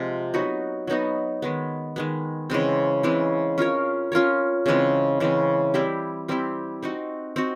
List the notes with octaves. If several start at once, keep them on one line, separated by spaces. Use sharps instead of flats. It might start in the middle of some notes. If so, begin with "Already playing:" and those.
Already playing: C3 F3 G#3
F#3 B3 D#4 F#4
F#3 B3 D#4 F#4
D#3 G#3 B3
D#3 G#3 B3
C#3 E3 G#3 C4
C#3 E3 G#3 C4
C#4 F4 A#4 C#5
C#4 F4 A#4 C#5
C#3 E3 G#3 C4
C#3 E3 G#3 C4
G3 C4 E4 G4
G3 C4 E4 G4
C4 D#4 F#4
C4 D#4 F#4